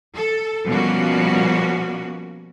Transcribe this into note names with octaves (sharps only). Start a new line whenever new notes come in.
A4
B2 F3 G3 A#3 C#4 F#4